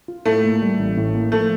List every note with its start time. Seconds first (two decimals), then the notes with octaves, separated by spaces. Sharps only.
0.08 F4
0.26 A2 A3
0.44 A#3
0.62 G3
0.79 A1
0.97 A2
1.14 A#3
1.32 F3 A3